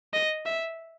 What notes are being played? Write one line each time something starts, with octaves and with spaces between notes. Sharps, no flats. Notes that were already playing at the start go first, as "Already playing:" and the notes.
D#5
E5